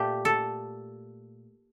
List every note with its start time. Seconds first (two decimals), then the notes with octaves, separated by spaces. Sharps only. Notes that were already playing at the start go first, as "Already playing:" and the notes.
Already playing: A#2 A3 G4
0.25 A4